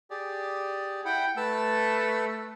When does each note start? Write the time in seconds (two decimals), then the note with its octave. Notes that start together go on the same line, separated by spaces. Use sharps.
0.10 G4 G#4 D5
1.05 E4 F#5 G5 B5
1.37 A3 B4 A5 E6